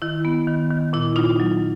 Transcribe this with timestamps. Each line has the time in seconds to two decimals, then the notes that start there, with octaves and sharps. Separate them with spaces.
0.02 D#3 E4
0.25 B3
0.47 D#3
0.70 D#3
0.93 A#2 E4
1.16 A#2 D#4 F4
1.40 F#3